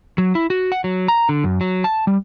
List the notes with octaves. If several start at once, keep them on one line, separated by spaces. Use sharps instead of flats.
F#3
E4
F#4
F#5
F#3
A#5
D3
F#2
F#3
A5
G3